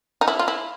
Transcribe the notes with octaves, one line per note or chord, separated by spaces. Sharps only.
D#4
E4
F4
E4